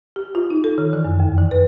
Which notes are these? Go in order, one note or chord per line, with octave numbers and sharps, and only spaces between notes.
G4
F4
D#4
A4
D#3
E3
F#2
F2
E3
B4